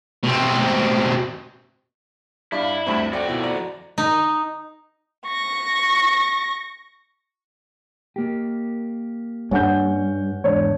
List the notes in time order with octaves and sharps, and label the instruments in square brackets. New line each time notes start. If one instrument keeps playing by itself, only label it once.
[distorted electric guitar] B2 C4
[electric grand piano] G2 [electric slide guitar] E4 [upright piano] D5 F5
[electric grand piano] D2 G2 C4 [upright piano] B5
[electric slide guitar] F2 F#4 [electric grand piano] D5 G5
[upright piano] B2 E4
[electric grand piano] D5 [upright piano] A#5
[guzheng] D#4
[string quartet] C#6 A#6
[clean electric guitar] A#3 G4
[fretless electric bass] G2 [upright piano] C#4 F#5 G6
[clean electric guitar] E2 G#2 D3 [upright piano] D4 C#5